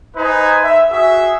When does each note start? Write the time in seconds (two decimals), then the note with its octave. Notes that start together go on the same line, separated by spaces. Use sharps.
0.16 D#4 B4 C5 G#5
0.63 E5
0.91 F#4 G#4 E5